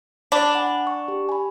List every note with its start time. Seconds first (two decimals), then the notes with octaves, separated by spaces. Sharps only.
0.32 D4 B5
0.55 F#5 G#5
0.87 C#6
1.08 G4
1.29 G#5 B5